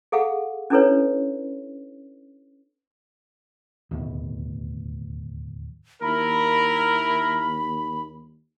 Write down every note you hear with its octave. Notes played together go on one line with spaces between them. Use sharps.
G#4 A4 F5 F#5
C#4 D4 E4 A4 B4 C#5
D1 D#2 B2
D#2 E4 A#4 B5